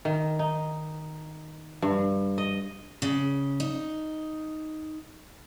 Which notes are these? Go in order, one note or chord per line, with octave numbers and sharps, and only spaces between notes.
D#3
D#4
G2
D#5
C#3
D#4